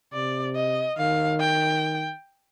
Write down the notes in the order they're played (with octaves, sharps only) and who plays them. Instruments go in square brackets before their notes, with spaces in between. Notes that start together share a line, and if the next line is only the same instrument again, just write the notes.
[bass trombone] C3 [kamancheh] D5
[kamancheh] D#5
[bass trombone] D#3 [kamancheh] F5
[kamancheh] G5